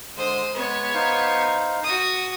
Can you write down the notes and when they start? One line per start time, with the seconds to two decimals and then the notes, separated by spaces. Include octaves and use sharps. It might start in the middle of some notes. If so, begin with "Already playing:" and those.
0.16 D3 G#3 C5 D#6
0.54 G#3 B3 C#5
0.94 D#4 C5 F5
1.84 F#4 D#6